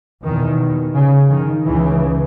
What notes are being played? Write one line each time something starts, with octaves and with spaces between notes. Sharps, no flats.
E2 B2 D#3
C#3
D#3
C#2 C#3 E3